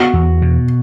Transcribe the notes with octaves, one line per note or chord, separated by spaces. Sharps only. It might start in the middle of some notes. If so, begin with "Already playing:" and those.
Already playing: B3 F#4
E2
B2